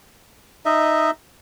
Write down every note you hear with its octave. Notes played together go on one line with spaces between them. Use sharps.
D#4 D#5 E5